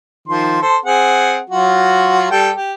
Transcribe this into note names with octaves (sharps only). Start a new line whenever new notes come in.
D#3 F3 C6
A4 C5
C4 G#4 F#5
F#3 F4 F#4
G3 A4 G5
G4